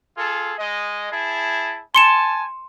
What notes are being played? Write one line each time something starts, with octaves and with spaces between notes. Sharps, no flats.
F4 G#4 A4
G#3 D#5
E4 G#4 A5
G#5 A5 C6 C#7 E7